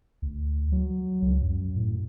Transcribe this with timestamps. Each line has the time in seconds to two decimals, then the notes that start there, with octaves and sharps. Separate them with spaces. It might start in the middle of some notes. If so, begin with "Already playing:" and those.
0.22 D2
0.72 F#3
1.22 C#2
1.42 F#2
1.76 A2